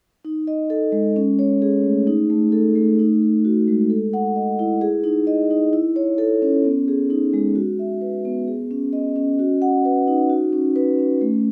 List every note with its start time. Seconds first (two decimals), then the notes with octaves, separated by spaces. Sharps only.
0.25 D#4
0.47 D#5
0.70 A4
0.92 G#3
1.16 C#4
1.39 C#5
1.62 G#4
1.84 A3
2.07 D#4
2.30 A3
2.52 A4
2.75 A3
2.99 D#4
3.22 A4
3.45 F#4
3.68 G#3
3.90 A4
4.13 F#5
4.36 D#5
4.59 E4
4.81 G#4
5.04 D#4
5.27 D#5
5.51 D#4
5.73 E4
5.96 C#5
6.18 A4
6.42 C#4
6.65 B3
6.88 G#4
7.10 D#4
7.34 G#3
7.55 F#4
7.79 E5
8.01 B4
8.25 B3
8.48 G#4
8.71 C#4
8.93 D#5
9.16 C#4
9.39 F#4
9.62 F#5
9.85 B4
10.08 D#4
10.30 F#4
10.53 C#4
10.76 B4
10.99 C#4
11.21 A3